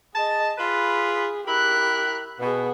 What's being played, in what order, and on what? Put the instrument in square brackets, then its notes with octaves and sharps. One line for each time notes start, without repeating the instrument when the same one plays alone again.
[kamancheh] G#4 D#5 [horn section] A5
[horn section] F4 B4 B5 [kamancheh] G#4
[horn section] E4 A#4 B5 [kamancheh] G4 F#6
[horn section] B2 [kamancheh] B3 G#4